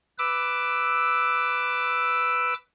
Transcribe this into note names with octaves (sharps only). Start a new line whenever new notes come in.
B4 D6 E6